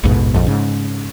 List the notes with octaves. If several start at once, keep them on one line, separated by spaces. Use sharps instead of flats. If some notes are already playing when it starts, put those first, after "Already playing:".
A1 E2 G#2 B2
A#1 F2
G#2 C#3